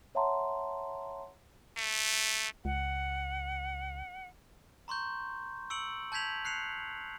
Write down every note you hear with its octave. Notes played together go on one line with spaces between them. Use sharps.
C#5 E5 F#5 A5 A#5 C6
A3
C#2 F#5
A#5 C6 C#6 G6
C#6 E6 C#7 D7 F#7
A5 G6 G#6 B6 F7 F#7
F#6 C7 C#7 F7